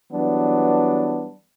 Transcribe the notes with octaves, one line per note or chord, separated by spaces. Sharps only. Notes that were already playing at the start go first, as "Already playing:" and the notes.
E3 F#3 G3 B3 D4